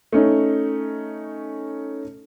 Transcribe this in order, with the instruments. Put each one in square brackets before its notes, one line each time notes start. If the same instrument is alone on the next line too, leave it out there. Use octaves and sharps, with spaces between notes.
[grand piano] A3 C#4 D#4